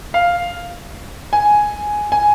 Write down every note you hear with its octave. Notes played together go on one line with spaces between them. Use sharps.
F5
G#5
G#5